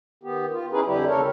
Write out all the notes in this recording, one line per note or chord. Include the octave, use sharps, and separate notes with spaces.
D#3 B3 G4
F4
C#4 D#4 E4 G#4 B4
F2 D3 G3 E4 G4
D#2 C#3 A4 A#4 C#5